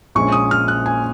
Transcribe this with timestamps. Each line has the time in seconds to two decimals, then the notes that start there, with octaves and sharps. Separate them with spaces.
0.15 A#1 A#2 G#3 C#4 C#6
0.32 D#6
0.51 F6
0.68 F#6
0.86 G#5